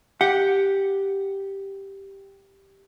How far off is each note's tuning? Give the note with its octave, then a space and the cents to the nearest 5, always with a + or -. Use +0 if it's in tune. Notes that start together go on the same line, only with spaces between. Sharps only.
G4 +0 F#5 +0